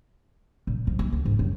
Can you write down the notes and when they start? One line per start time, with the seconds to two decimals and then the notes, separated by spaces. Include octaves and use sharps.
0.67 A#2
0.87 F3
0.99 A#3
1.13 D2
1.25 G#2
1.39 F#2